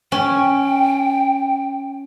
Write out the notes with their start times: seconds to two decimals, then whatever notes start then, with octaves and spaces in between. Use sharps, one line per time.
0.12 C#4 G5